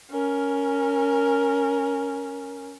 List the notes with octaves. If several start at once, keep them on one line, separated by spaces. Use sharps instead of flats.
C#4 A#4